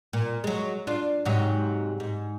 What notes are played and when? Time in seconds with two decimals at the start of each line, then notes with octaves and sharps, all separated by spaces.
0.13 A#2
0.44 F#3 G#3
0.87 D4 F4
1.25 G#2 C3 F#3
2.00 G#2